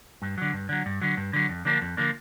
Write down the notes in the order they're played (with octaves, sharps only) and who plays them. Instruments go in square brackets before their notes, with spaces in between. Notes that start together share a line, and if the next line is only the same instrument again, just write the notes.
[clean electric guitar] G2
D3 F#3
G2
D3 F#3
G2
D3 F#3
G2
D3 F#3
F2
D3 F3 A#3 D4
F2
D3 F3 A#3 D4